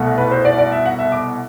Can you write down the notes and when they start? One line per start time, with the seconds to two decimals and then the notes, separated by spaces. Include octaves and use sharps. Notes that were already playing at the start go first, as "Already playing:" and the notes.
Already playing: C2 B2 A3
0.18 B4
0.31 C5
0.45 D5
0.58 D5
0.72 E5
0.85 F#5
0.99 E5
1.12 D6